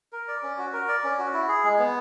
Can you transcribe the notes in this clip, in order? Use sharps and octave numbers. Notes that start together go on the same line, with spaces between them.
A#4
D5
C#4
F#4
A#4
D5
C#4
F#4
E4
G#4
G#3
B3